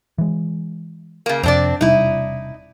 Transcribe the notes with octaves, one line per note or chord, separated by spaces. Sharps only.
E3 G#3
C#3 A#3
F2 C3 C4 D4 D5
E1 C3 G3 D#4 E4